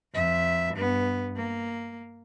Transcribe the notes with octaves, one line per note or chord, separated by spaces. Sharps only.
F2 E5
G2 B3
A#3